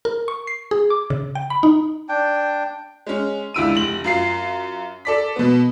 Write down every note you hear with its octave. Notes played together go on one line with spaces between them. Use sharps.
A#4
C#6
C7
G#4
D6
C#3
G5
B5
D#4
D4 G5
G#3 C#4
C#2 D3 E4 E6 D7 D#7
F1 F#7
F#2 F4 C7
A4 D5 B6
B2 B3